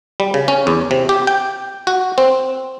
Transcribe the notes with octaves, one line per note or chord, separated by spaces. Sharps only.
G3
C#3
C#4
E2
C3
G4
G5
F#4
C4